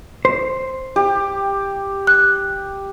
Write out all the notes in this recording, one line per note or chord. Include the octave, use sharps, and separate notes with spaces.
C5
G4
F#6